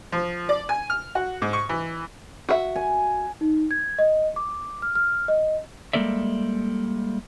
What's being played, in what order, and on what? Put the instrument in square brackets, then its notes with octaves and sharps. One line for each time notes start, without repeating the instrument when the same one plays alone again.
[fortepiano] F3
D5
G#5
F6
F#4
G#2
C#6
E3
[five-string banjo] F#4 E5
[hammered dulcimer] G#5
[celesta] D#4
G#6
D#5
D6
F6
F6
D#5
[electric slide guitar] G3 G#3 A#3 A4 D5 E5